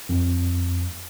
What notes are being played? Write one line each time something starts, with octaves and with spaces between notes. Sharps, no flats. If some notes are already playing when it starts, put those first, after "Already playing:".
F2